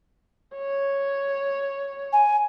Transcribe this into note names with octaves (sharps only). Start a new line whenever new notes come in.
C#5
G#5